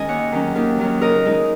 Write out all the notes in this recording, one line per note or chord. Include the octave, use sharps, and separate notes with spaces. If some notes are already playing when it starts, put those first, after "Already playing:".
Already playing: D#3 G#3 C#4 D#5 G#5
D#2 C#5 F#5
D#3 F#3 C#4
D#2
D#3 F#3 C#4
C#3 A#4 D#5
G#3 D#4